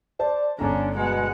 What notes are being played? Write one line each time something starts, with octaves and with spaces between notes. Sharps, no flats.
C5 D5 A5
G1 D3 C#4 D4 A#5
B2 G#3 F#5